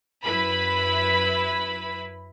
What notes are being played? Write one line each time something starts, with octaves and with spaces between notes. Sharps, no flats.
F#2 E4 B4 B5